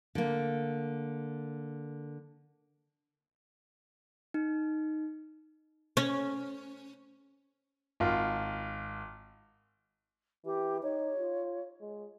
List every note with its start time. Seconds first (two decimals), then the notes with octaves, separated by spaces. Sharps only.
0.15 D3 A#3
4.34 D#4
5.97 C#4
8.00 G#1 F4
10.45 E3 G4
10.83 D#4 C#5
11.18 F4
11.80 G#3